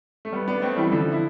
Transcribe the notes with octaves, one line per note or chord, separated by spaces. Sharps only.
A3
G3 B3
B3 D4
A3 C4
E3 G3
E3
D3 F3
E4